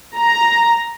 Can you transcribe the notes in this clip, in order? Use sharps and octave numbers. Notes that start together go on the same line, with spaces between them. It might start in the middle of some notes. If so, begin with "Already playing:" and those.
A#5